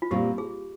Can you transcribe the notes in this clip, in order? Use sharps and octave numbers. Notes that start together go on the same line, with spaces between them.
F4
A#2 G3 C4 G4
G#4